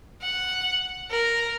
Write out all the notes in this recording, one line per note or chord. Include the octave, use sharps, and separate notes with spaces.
F#5
A#4